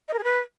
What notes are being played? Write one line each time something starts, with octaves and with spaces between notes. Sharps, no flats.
D#5
A#4
G#4
B4